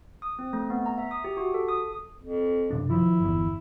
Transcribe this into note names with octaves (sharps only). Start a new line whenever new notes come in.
D#6
C4
A3
B3
A#5
E5
D#6
G4
F#4
A4
D#6
F2
F#2 C3 D4
D#3 F3 E4
G1 E2